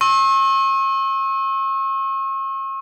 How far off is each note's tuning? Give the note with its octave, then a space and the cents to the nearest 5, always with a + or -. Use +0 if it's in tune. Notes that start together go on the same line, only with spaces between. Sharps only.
C#6 -45 E6 -20